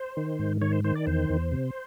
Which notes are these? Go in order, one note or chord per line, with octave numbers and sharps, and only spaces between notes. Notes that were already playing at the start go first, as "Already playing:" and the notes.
Already playing: C5
D#3
G#2
D#3 C#5
C5
D#3 C5
D5
E2 C5
E2
C3